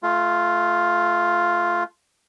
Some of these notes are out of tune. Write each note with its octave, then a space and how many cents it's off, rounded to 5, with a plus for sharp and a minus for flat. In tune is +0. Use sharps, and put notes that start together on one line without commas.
A3 -25 F4 +0